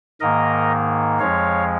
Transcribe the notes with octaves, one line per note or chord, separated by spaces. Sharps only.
G#2 D#3 A#3 A#4 D#5
F2 F3 G#3 C#5 F5